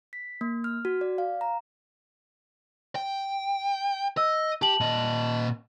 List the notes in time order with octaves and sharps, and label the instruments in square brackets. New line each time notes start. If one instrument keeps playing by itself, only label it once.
[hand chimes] B6
A#3
F6
F#4
D5
F5
A#5
[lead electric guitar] G5
[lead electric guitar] D#5 [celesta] E6
[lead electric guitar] G4 [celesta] A5 F#7
[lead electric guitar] A#2 D#5